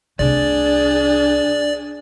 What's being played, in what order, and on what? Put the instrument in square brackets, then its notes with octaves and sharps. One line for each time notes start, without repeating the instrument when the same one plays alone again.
[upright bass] C2 A3 [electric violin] D4 G#4 [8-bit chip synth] D5